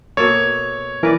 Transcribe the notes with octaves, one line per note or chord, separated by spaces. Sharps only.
B2 A#3 A4 C#5
E3 A#4 B4 D5